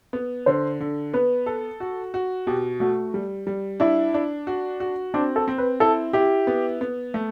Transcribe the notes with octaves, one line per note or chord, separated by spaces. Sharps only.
B3
D3 C5
D3
B3 B4
A4
F#4
F#4
B2 G4
A3 F#4
G3
G3
D4 E4
D4
F#4
F#4
C4 D4
A4
C4
B4
E4 A4
E4 G4
B3
B3
A3